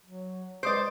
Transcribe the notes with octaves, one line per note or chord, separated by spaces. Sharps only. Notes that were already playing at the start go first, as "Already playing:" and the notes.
F#3
G#3 B4 C5 D5 D#6 D7